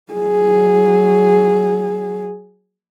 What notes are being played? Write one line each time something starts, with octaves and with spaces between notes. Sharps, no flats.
F#3 G#4